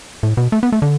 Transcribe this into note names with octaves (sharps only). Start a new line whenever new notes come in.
A2
B2
A3
B3
A3
D3